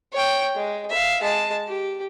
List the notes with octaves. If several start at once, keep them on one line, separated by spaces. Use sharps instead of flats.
C#5 G5
G#3
E5 F5
G#3 A5
G4